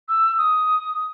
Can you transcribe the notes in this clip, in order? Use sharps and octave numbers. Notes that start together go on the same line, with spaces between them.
E6
D#6